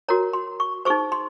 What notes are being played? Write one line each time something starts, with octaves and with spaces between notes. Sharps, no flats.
F#4 A#4 C#5 A#5
C6
C#6
D#4 G#4 C5 C#6
C6